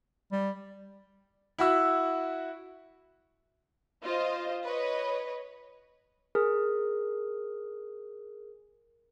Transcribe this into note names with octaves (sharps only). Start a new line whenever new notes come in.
G3
E4 F#4 E6
F4 C5 D#5
B4 C#5 D#5
G#4 A#4